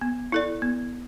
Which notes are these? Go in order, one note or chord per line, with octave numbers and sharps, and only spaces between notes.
B3
E4 A4 D5
B3